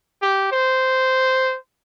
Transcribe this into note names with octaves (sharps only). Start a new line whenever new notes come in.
G4
C5